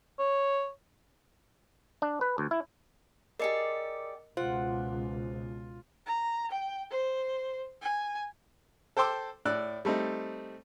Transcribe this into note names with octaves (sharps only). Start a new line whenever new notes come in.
C#5
D4
B4
D2
E4
G4 G#4 A#4 D5 D#5 C#7
C#2 B2 F4 C5 F#5
A#5
G5
C5
G#5
A4 C5 G5 C6 D6 E6
A2 D5 E6 F#6
G3 A3 C4 D#4